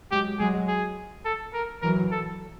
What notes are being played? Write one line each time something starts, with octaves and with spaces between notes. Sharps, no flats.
F#3 G#3 G4
F#3 G#3 G#4
G#4
A4
A#4
E3 F#3 A#4
A4